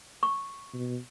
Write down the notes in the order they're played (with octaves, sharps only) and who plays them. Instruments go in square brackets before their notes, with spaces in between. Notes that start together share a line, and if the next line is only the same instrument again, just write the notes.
[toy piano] C#6
[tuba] B2